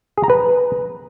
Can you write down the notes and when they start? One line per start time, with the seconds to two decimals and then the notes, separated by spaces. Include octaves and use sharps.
0.18 G#4
0.24 A#5
0.30 B4